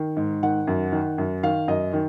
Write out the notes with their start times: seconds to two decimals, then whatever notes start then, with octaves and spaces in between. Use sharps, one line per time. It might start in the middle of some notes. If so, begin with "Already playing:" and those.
Already playing: D#3
0.17 G#2
0.43 D#3 F#5
0.67 F#2
0.92 D#3
1.18 F#2
1.43 D#3 F5
1.68 F#2 D#5
1.93 D#3